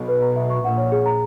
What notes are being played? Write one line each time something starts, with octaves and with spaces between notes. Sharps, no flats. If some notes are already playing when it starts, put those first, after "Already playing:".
Already playing: B1 B2
B4
A#5
E5
C#6
A#1 A#2 F#5
C#5
G#4
A#5